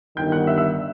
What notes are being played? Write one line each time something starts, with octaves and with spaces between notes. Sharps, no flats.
G1 G2 D#3 G5 G6
F#5 F#6
E5 E6
E5 E6